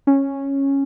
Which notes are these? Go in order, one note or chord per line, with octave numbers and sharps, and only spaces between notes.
C#4